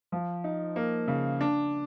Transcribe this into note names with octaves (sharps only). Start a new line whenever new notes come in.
F3
D#4
A#3
C#3
D4